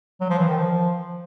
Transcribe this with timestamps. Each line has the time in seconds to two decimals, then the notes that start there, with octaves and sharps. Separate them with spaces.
0.21 F#3
0.30 F3
0.39 E3
0.48 D#3
0.57 F3